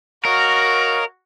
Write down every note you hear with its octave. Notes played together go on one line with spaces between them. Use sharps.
F#4 A#4 C#5 D#5 F5